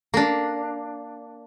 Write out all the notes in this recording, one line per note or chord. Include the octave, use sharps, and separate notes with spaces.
A#3 D4